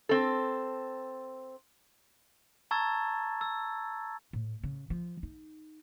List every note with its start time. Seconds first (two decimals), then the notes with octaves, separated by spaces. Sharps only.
0.09 C4 A4
2.71 A5 A#5 C#6 E6 G#6 A6
3.41 E6
4.33 A2
4.64 C#3
4.90 F3
5.23 D#4